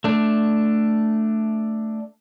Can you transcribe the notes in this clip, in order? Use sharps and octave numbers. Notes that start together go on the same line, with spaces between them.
A3 D4